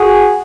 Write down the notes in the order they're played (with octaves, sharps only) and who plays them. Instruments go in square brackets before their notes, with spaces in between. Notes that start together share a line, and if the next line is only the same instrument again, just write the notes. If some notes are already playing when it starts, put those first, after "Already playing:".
Already playing: [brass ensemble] F#4 G#4